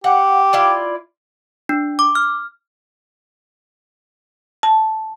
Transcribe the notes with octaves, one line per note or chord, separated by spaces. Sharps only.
G4 F#5
E4 F4 D5
D4
D6
F6
A5